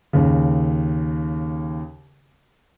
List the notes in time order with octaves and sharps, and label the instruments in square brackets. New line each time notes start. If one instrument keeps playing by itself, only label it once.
[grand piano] D#2 C#3